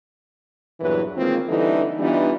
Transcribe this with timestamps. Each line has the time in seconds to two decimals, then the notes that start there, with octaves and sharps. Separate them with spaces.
0.81 E2 G2 A#2 E3 F#3 B4
1.15 D#3 G#3 A#3 C4 F4
1.49 D3 E3 G3 D#4 A4
1.99 E3 G3 B3 D4 D#4 F4